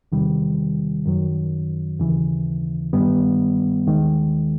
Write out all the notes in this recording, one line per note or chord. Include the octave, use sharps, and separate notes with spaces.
E2 C3 D#3 G3
F#2 D#3 F#3
D#2 C#3 E3
G2 D#3 G3 B3
D#2 D#3 G#3